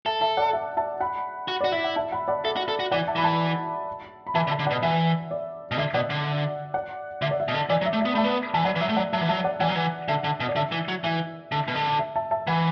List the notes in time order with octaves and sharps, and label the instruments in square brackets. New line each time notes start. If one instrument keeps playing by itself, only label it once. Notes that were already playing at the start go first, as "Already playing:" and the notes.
[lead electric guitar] A4 [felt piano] E5
[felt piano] E5 A5
D5 F#5
E5
E5 A5
F#5 B5
[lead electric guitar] F#4
[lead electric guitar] F#4 [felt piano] D5
[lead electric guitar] E4 [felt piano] E5
[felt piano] F#5
E5 A5
F#5 B5
D5 F#5
[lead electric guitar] A4 [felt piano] E5
[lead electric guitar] F#4
A4
F#4
[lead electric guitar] E3 [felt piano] D5 F#5
[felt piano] E5 A5
[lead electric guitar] E3 [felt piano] B5
[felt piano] E5 A5
B5
[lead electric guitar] E3 [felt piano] E5 A5
[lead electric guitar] D3
[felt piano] E5 A5
[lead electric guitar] D3
[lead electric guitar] B2 [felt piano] D5 F#5
[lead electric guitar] E3 [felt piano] E5
[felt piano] D5
[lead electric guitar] B2
[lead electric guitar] D3 [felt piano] E5
[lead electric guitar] B2 [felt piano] D5 F#5
[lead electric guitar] D3
[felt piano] D5 F#5
[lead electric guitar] D3 [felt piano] E5
[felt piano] D5
E5
[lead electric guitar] B2
D3
[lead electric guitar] E3 [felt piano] D5
[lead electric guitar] F#3
[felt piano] E5
[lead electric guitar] A3
[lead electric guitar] B3 [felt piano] E5
[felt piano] B5
[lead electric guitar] A3 [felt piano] E5 A5
[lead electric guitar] B3
[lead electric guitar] E3 [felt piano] A5
[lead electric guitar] F#3 [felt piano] D5 F#5
[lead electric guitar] E3
[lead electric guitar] F#3 [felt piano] E5
[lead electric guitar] A3
[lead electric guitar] F#3 [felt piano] D5 F#5
[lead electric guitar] F#3 [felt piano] E5 A5
[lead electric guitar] E3
[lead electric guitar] F#3 [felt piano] E5 A5
[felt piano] D5 F#5
[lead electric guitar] E3 [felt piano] D5 F#5
[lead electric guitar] F#3
E3
[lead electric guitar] D3 [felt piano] E5
[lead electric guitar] D3
B2
[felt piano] D5
[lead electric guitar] D3 [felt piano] E5
[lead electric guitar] E3
F#3
[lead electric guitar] E3 [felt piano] E5
[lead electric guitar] D3
B2
D3
[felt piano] E5
E5 A5
E5 A5
[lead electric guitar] E3 [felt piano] F#5 B5